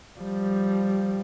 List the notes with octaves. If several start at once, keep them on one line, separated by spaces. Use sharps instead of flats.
F3 G3